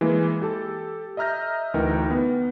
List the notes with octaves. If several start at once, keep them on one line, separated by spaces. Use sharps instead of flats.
E3 G#3 A#3
G4 A4 A5
D#5 E5 A#5 F6 G6 A#6
D2 E3 D#4 A#4 G5
B3